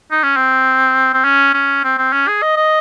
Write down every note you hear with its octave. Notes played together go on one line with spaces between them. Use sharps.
D#4
C#4
C4
C4
C#4
C#4
C4
C4
C#4
G#4
D#5
D#5